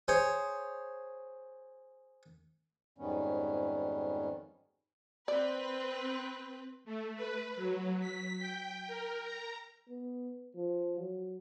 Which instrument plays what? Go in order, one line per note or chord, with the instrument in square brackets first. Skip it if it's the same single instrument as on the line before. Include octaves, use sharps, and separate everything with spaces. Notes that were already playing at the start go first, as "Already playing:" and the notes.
[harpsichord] G#4 C5 C#5
[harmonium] F2 G#2 D#3 G3 B3 C#4
[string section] C4 B4 [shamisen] D5
[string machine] A3
B4
F#3
B6
G5
A#4
A#5
[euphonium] B3
F3
F#3